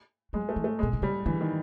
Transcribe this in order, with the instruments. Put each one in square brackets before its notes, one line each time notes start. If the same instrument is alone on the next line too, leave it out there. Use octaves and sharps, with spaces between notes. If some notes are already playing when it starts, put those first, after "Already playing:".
[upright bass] F#3 [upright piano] G#3
[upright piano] A3
[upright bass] E3
[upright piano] A3
G#3
[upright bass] B2
C3
[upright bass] C#3 [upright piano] G3
[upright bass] D3 [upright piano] E3
[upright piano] D#3